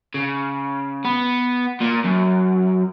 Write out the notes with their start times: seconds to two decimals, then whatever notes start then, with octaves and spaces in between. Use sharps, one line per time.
0.15 C#3
1.05 B3
1.80 A#2
2.04 F#2